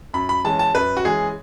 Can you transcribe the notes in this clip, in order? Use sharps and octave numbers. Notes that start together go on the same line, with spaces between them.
F#2 B5
B5
E3 G#3 C#4 A5
A5
F#2 B4
F#4
E3 G#3 C#4 G#4